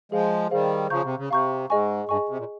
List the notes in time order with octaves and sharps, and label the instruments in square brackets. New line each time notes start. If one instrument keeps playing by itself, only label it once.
[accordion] F3 G#3 [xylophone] G#4 C5 F5
[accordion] D#3 G3 [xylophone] G#4 C5 F5
[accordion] C#3 F3 [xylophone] F5 A#5 C#6 G6
[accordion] C3
C#3
[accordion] C3 [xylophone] F5 A#5 C#6 G6
[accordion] G#2 [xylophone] G#4 D#5 G#5 C#6
[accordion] G2 [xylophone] G#4 D#5 G#5 C#6
[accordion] C3
A#2